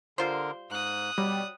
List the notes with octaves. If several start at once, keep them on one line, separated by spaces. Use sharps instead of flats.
D3 G3 F4 A#4 C5
G#2 D#6 F#6
B2 F#3 G3